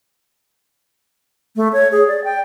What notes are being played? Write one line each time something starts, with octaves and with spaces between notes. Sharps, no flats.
A3
C#5
G#4
D5
G5